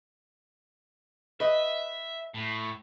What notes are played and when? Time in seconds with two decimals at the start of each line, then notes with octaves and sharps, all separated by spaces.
1.40 B4 D#5 E5
2.34 A2